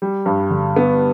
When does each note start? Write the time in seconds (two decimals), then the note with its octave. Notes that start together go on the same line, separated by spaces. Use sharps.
0.02 G3
0.26 G2
0.50 D3
0.76 B3